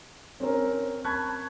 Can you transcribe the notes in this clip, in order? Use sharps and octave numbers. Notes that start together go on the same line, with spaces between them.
C4 C#4 A#4
A5 B5 C#6 F#6 G#6